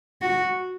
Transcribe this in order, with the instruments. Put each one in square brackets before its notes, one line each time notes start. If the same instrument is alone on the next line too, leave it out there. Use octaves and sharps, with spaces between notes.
[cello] F#4